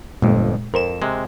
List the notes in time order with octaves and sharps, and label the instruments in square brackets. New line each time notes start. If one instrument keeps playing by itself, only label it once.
[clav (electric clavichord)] G1 F2 [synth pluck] A#2 G#3
[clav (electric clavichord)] F2 [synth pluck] A#4 C5 E7
[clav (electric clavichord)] C3 G#3